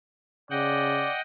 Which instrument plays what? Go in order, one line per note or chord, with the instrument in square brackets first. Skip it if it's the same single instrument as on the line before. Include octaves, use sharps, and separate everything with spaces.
[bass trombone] C#3 [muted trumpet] D5 [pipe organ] D#5 F#5 G5